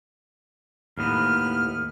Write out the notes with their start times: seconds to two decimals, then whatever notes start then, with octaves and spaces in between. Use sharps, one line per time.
0.98 D#2 A2 B3 F6